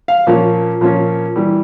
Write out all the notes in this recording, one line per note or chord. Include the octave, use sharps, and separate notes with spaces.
F5
A#2 F3 A#3 C#4
A#2 F3 A#3 C#4
E3 G3